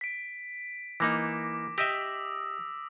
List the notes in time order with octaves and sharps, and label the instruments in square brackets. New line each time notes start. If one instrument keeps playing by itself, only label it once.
[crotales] B6 D7
[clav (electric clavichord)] E3 A#3 D#4 [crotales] D6 A#6
[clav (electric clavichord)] G4 D#5 E5 [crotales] D#6 E6 A#6